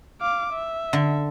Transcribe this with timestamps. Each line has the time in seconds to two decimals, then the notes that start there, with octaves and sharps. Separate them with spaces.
0.21 F5 D6
0.52 E5
0.93 D3